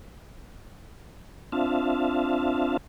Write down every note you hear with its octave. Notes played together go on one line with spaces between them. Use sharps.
C4 D4 F4 E5 F5 A5